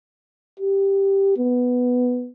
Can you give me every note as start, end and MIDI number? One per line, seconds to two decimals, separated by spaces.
0.60 1.33 67
1.37 2.30 59